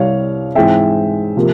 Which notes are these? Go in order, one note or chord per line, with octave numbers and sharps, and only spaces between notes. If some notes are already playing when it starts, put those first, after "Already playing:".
Already playing: C2 C3 G3 C#5 F5
G#2 E3 G#3 C4 E5 G5
C3 F3 A#3